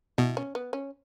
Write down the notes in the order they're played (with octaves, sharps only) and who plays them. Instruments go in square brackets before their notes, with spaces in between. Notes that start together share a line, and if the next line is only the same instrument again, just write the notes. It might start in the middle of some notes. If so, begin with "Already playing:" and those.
[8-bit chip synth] B2 [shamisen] E4
[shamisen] C#4
B3
C#4